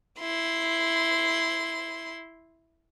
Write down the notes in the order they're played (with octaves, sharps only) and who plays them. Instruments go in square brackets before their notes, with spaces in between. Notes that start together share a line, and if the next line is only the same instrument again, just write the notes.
[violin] E4 C6